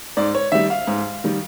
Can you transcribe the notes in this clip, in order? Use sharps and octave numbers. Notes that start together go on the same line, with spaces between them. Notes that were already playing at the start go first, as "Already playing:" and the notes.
G#2 D5
C#5
D#3 G3 E5
F5
G#2
D#3 G3